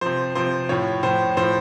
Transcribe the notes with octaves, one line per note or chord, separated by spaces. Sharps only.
C3 F3 C5
C3 F3 C5
A2 F3 C#5
A2 F3 C5
A2 F3 C5